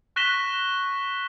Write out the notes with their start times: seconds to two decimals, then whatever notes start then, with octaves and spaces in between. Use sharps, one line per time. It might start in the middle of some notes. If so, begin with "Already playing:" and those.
0.16 C#6 F#6 A#6 B6 E7 G7